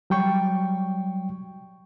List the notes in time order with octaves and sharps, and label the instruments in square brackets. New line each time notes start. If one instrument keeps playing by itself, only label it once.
[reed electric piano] F#3 G3 G5 C#6